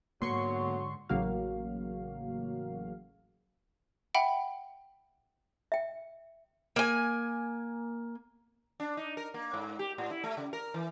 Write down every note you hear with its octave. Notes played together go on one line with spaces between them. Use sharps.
G#2 D3 F#3 A#3 B3 C6 C#6
A1 C#3 F#3 A#3 F#4 F5
E5 F#5 G5 B5
E5 G5
A#3 G#5
D4
D#4
A#4
A#3
G#2
G4
A2
E4
A3
C#3
A#4
E3